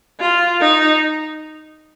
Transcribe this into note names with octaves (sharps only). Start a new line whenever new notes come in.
F4
D#4